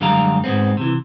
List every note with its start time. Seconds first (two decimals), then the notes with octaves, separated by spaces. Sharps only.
0.01 F#2 D3 G3 G#3 F5 A#5
0.44 G#2 G#3 B3 C4
0.77 C3 E3